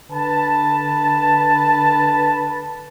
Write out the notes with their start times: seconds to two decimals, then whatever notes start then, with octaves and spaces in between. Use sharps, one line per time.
0.11 D3 B4 A5